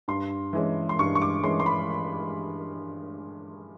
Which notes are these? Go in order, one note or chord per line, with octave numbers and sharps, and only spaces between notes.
G2 C6
E3 G#3 C#4
C6
G2 C#6
C#6
D6
E3 G#3 C#4 C6
C6
B5